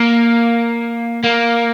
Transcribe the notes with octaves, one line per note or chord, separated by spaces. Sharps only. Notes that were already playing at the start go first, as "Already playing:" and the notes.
Already playing: A#3
A#3